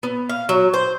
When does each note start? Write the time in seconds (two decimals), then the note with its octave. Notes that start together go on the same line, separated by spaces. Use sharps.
0.03 B3
0.29 F5
0.49 F#3
0.74 C5